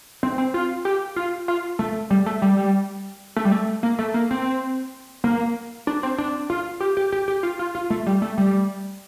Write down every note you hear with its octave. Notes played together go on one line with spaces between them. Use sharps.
C4
C4
F4
G4
F4
F4
A3
G3
A3
G3
A3
G3
A3
A#3
A3
A#3
C4
A#3
D4
C4
D4
F4
G4
G4
G4
G4
F4
F4
F4
A3
G3
A3
G3